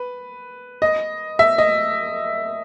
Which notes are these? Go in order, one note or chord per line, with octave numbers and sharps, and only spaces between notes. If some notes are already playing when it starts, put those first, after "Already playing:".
Already playing: B4
D#5
E5
D#5